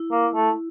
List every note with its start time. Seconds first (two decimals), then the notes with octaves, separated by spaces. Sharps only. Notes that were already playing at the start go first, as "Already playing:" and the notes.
Already playing: E4
0.11 A#3
0.35 A3